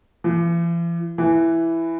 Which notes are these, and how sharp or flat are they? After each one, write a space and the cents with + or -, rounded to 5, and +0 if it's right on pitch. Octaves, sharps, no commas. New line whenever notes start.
E3 +45
E3 +5